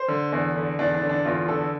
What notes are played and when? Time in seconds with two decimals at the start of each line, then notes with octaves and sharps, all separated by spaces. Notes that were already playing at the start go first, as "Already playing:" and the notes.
Already playing: C5
0.08 D3
0.32 E2
0.56 D3
0.79 E2 D4
0.94 D4
1.01 D3
1.09 D4
1.25 E2 F4
1.48 D3 A4